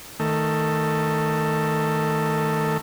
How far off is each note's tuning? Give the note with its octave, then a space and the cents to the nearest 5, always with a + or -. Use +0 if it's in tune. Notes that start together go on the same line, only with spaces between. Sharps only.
D#3 +10 A3 +15